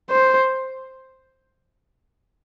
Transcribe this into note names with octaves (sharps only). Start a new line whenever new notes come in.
C5